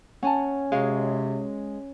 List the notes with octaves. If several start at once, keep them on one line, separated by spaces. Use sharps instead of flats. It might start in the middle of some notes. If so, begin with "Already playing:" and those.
C#4 F#5 G#5 A5
C3 G#3 F#4 C#5 F5